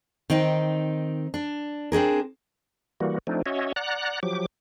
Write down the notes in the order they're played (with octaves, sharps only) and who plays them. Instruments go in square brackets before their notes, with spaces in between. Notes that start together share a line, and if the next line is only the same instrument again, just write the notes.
[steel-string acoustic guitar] D#3 C4 D#4
D4
C4 D4 G#4 A#4
[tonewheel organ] E3 G3 A#3 F#4
F3 A3 C4 D4 D#4
C#4 F#4 C#5 D#5 E5
D5 F#5 A#5 F#6
F3 F#3 G4 D6